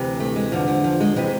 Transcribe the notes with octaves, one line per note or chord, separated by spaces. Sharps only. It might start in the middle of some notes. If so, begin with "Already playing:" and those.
Already playing: D2 C3 E3
A3
G#3
E2 D3 F3
F3
F3
G#3
C3 E3 G#3